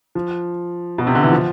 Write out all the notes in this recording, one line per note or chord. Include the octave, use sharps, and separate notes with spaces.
F3
B2
C3
D3
E3
F3